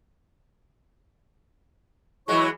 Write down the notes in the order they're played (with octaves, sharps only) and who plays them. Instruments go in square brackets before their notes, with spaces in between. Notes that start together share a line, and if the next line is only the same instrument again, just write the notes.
[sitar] E3 F#3 G#3 [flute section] E4 C#5 C#6